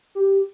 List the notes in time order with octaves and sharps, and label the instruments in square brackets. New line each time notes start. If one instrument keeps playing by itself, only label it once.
[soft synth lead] G4